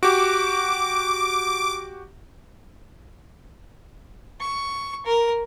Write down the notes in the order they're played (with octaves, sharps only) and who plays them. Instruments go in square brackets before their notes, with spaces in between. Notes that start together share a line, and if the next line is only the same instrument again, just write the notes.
[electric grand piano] F#4 G4 [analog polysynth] D6
[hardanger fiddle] C#6
A#4